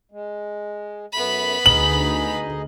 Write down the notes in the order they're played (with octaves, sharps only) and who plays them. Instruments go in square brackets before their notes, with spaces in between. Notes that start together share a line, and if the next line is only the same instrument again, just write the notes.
[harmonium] G#3
[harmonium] F#2 A3 [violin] B3 B5
[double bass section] D2 [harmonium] D#4 G#4 D#5 [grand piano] F#7